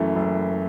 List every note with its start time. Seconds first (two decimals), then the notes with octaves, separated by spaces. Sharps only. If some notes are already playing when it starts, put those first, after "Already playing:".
Already playing: F#1 F#2 E3 A3
0.15 F#1